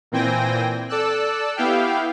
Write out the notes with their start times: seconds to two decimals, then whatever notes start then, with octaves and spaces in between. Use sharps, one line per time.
0.12 A#2 E3 C4 G5 G#5 A#6
0.89 A4 D5 E6 F#6
1.56 B3 E4 G4 F5 G5